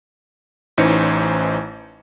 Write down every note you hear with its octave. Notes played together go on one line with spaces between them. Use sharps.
A1 E3 C#4 D#4 C5 C#7